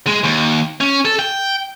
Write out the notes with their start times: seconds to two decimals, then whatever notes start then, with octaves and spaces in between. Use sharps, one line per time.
0.07 G#3
0.24 D#2
0.81 C#4
1.05 A4
1.19 G5